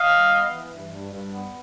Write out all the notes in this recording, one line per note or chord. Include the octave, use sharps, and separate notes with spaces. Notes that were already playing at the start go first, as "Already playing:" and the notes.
Already playing: D#5 F5
G3
B3
E3
G2
G2
G2
B3